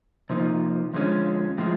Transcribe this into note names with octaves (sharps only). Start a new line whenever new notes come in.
C3 F3 A#3 D#4
F2 D3 F3 G#3 C#4
A2 F3 G#3